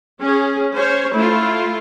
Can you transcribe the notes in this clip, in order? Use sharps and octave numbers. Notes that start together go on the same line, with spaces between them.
C#4 G#4
C#4 C5 C#5
A3 E4 F4